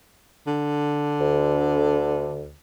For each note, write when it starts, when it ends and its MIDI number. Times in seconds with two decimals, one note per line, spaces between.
0.47 2.54 50
1.20 2.53 38